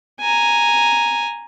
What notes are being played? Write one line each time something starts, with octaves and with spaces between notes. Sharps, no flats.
G#5 A#5